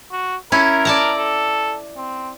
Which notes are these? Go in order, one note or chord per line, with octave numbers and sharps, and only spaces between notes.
F#4
C#4 E4 A#4
D5 A5 A#5
A4
C4